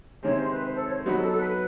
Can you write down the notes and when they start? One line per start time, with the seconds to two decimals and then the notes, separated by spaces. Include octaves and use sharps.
0.23 C3 D#3 G#3 C4 C#5
0.36 C5
0.51 B4
0.64 C5
0.74 A4
0.85 C#5
0.95 C5
1.06 F#3 B3 D#4 F#4 B4
1.16 A4
1.27 A4
1.37 B4